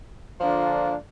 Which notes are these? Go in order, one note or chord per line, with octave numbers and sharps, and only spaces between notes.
D3 F3 A#3 D4 F4